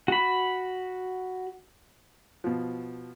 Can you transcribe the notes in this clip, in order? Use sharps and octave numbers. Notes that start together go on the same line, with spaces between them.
F#4 B5
B2 F3